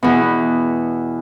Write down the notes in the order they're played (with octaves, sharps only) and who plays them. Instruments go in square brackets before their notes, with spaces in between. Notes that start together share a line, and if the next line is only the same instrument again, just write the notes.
[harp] E2 B2